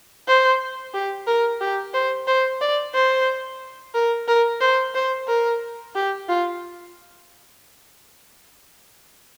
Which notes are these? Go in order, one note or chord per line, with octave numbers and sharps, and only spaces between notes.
C5
G4
A#4
G4
C5
C5
D5
C5
A#4
A#4
C5
C5
A#4
G4
F4